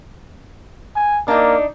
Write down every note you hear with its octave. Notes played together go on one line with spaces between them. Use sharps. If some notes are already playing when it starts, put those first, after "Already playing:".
G#5
A#3 D4 D#4